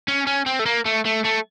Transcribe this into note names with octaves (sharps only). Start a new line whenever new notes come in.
C#4
C#4
C4
A3
A#3
A3
A3
A3